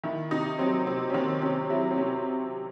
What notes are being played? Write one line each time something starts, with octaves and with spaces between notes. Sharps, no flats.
D#3 E4
C3 D#4
F#3 C4
C3 C4
C#4
D#3 C4
C3 C#4
F#3 E4
C4
C3 C#4